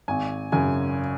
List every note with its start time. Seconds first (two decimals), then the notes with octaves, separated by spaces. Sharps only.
0.08 G#1 G#5
0.52 F#2 C#3 G#5